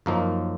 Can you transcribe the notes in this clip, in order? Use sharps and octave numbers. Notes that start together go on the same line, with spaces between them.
F#2 F3 A#3 D#4